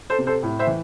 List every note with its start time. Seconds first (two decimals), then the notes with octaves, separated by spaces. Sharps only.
0.10 A4 C5
0.19 C3
0.27 A4 C5
0.43 A2
0.59 C5 E5
0.67 E3